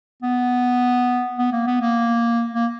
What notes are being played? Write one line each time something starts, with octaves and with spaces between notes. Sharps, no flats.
B3
B3
A#3
B3
A#3
A#3